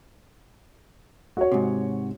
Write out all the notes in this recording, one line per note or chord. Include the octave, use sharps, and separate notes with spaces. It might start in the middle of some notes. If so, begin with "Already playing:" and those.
F#4 C#5
G#2 C3